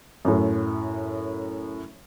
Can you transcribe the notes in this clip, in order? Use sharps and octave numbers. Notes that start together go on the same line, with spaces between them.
F#2 A2